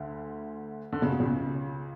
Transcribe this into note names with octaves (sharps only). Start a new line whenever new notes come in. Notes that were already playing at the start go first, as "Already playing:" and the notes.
Already playing: D2 D3
D3
C#3
B2
C#2 C#3